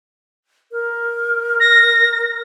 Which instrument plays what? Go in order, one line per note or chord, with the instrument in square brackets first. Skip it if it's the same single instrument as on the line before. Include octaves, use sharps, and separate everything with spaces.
[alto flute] A#4
[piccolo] A#6